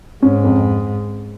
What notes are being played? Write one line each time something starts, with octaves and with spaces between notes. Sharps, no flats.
G#2 C#4
F2